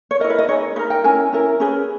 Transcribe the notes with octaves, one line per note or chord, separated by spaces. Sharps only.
C#5
E4 A#4 D#5
B4
D#5
D#4 G#4 B4 C#5
D#4 A#4 B4
G5
C#4 E4 A#4 G#5
C#4 E4 A#4
C#4 G#4 B4